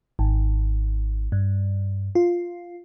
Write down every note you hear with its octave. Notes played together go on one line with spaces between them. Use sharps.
G#1
G2
F4